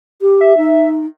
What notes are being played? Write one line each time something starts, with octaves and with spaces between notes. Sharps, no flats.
G4
E5
D#4